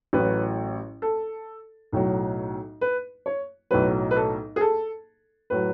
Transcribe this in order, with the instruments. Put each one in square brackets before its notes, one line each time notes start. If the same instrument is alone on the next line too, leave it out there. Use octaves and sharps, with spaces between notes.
[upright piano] A1 A2 F#3 B4
A4
B1 A2 F#3
B4
C#5
B1 A2 F#3 B4
B4
A4
G#4
A4
A2 F#3 B4